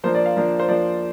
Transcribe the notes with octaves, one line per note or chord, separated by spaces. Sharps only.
F3 A#3 D4 C5
D5
F5
F3 A#3 D4
C5
F3 A#3 D4 D5